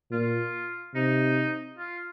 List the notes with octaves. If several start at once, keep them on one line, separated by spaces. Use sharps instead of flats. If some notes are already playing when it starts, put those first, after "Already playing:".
A#2 F4
C3 D#4
F4